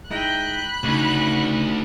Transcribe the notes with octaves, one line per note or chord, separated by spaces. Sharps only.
G#3 D#4 E4 D#5 G5 B5 F#6
D2 C#3 D#4